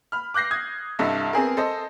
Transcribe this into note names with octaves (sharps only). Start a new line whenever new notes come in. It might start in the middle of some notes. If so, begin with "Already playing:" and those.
B5 F6
D6 F#6 G6 A#6 C7
D#6 G#6
C2 G2 E4 A4 D#5 E5
B3 C4 G#4 A#4
A4 C5 D#5